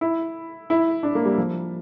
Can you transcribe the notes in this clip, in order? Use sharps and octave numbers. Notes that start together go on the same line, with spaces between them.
E4
E4
D4
A#3
G3
F3